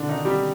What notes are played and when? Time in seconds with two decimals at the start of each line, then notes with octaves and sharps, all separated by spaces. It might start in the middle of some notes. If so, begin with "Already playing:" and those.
Already playing: B2 D3 D4
0.08 D#3 D#4
0.25 G3 G4